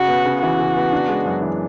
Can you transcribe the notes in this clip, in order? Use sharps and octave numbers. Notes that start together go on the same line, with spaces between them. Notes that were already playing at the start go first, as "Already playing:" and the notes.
Already playing: C#3 F#4
B3
C#3
E3 F#4
C#3
B3
D4
G#3
F#2
E3